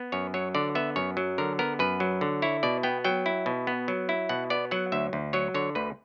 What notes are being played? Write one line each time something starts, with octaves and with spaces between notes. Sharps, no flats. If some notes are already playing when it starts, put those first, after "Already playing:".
Already playing: B3
F#2 C#5
F#3 C#5
D3 D5
B3 E5
F#2 C#5
F#3
D3 A#4
B3 A#4
F#2 B4
F#3
D3
E4 C#5
B2 D5
B3 G5
F#3 G5
E4
B2
B3
F#3
E4
B2 F#5
B3 D5
F#3 F#5
D2 E5
D2
F#3 C#5
D3 C#5
D2 B4